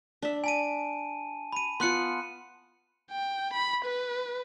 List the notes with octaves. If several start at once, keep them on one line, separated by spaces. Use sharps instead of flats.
D4 E5
G#5 A5 D#7
B5 D#7
B3 F4 C6 F#6 C#7
G5
B5
B4